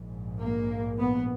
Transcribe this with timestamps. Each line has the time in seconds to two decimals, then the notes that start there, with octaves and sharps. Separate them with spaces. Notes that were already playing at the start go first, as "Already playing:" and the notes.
Already playing: A#1 G#2
0.41 A#3
0.98 B3